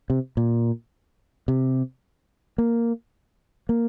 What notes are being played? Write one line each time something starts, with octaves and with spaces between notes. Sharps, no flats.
C3
A#2
C3
A#3
A#3